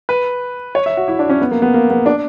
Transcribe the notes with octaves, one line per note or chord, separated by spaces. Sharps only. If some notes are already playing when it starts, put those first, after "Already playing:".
B4
C#5
E5
F#4
E4
D4
C#4
B3
A#3
B3
A#3
B3
D4